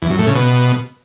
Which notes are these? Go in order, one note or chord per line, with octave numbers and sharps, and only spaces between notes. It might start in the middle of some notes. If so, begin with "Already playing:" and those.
E2
F#2
A2
C#3
B2